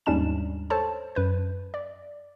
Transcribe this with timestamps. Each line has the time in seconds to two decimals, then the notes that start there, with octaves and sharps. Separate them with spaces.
0.06 D#2 G#2 G3 C#4 D4 E7
0.70 A4 C5 C#5 A5
1.15 F#2 B4 G6
1.74 D5